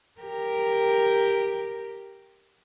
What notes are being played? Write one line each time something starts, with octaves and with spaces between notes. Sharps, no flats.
G4 A#4